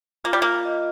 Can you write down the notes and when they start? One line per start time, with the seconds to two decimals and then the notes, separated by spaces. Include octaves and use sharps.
0.24 A#3 F4
0.33 G3
0.42 A#3 F4
0.65 D#5